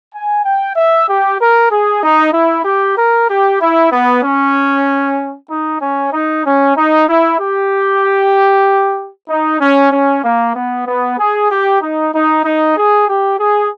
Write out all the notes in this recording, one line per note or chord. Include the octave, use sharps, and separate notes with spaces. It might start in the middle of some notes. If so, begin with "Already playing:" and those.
G#5
G5
E5
G4
A#4
G#4
D#4
E4
G4
A#4
G4
E4
B3
C#4
D#4
C#4
D#4
C#4
D#4
E4
G4
D#4
C#4
C#4
A#3
B3
B3
G#4
G4
D#4
D#4
D#4
G#4
G4
G#4